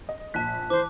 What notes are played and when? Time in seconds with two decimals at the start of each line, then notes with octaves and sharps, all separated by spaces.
0.09 D#5
0.34 A#1 A5 F#6 B6
0.70 E3 C5 D6